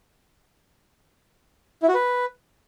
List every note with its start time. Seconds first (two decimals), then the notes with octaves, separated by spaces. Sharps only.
1.82 E4
1.88 F#4
1.94 B4